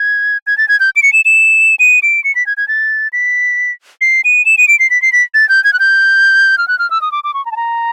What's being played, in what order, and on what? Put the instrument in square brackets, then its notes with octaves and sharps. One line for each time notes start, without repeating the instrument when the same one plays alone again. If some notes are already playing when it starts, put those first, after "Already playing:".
Already playing: [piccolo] G#6
G#6
A6
G#6
G6
D7
C#7
E7
E7
D#7
D7
C#7
B6
G#6
G#6
A6
B6
C7
D#7
E7
D#7
D7
C7
B6
C7
B6
A6
G6
G#6
F#6
G6
F6
F#6
F6
E6
D#6
D6
D6
C#6
A#5
A5
A#5